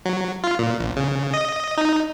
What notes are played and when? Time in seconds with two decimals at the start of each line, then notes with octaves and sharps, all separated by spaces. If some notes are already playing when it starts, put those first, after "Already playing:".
0.06 F#3
0.44 F4
0.59 A#2
0.79 A#1
0.97 C#3
1.34 D#5
1.77 D#4